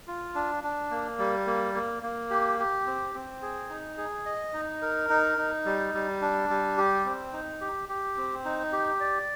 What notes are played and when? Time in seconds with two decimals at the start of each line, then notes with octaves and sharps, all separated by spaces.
0.07 F4
0.35 D4
0.64 D4
0.91 A#3
1.19 G3
1.47 A#3
1.74 A#3
2.03 A#3
2.31 G4
2.59 G4
2.87 C4
3.15 C4
3.42 G#4
3.70 D#4
3.98 G#4
4.26 D#5
4.54 D#4
4.82 A#4
5.10 D#4
5.38 D#4
5.65 G3
5.94 G3
6.21 D4
6.49 G3
6.78 G4
7.05 C4
7.33 D#4
7.61 G4
7.89 G4
8.17 C4
8.45 D#4
8.72 G4
9.00 D5